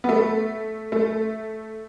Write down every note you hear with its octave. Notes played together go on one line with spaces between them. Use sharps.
B3
A3
A3